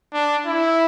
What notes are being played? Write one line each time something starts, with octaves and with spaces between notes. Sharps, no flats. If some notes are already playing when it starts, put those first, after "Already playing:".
D4
E4